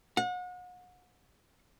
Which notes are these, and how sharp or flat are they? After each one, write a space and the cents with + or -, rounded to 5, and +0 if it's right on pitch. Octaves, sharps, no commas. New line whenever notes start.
F#5 -35